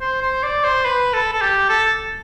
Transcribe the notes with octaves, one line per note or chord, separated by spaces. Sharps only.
C5
C5
D5
C5
B4
A4
A4
G4
A4